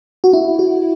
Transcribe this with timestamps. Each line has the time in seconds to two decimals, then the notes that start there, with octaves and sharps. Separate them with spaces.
0.24 F#4
0.33 E4
0.59 F#4